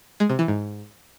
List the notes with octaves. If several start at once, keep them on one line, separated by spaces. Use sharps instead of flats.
G#3
C3
E3
G#2